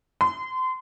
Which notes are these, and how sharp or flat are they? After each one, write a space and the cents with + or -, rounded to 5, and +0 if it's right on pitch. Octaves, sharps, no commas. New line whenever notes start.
C6 -30